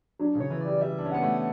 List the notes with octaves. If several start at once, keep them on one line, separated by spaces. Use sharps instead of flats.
F#3 D4
C#3
C#5
E3
D5
G3
G3 E5
D4
C#4
B3 F#5
A3